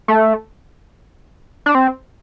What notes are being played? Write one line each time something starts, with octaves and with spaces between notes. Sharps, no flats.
A3
D4
C4